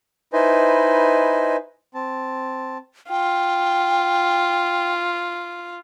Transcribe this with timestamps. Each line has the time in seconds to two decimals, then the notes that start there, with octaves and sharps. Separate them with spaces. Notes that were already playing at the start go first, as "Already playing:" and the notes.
0.33 D#4 E4 B4 C5 D#5 G#5
1.94 C4 A5
3.10 F4 G5